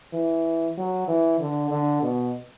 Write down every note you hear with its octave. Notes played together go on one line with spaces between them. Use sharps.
E3
F#3
E3
D3
D3
B2